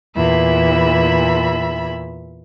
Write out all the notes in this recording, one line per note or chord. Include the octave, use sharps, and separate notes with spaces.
E2 A#2 E5 B5